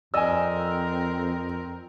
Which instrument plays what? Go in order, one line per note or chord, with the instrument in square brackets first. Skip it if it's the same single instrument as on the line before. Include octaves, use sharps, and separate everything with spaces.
[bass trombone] F2 [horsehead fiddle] C4 A#4 [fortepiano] D5 G#5 [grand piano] D#5 E6